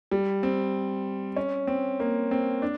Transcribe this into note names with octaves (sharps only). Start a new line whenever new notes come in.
G3
C4
C#4
C4
A#3
C4
D4